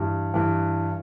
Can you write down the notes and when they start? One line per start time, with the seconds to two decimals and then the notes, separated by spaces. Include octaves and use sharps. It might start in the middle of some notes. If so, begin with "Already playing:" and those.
Already playing: G2 E3
0.34 G2 E3